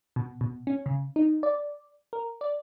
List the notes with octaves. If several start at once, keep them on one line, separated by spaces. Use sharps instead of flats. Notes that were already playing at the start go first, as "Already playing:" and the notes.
B2
B2
C#4
C#3
D#4
D5
A#4
D5